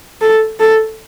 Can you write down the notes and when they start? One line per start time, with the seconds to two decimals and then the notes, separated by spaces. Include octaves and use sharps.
0.21 A4
0.60 A4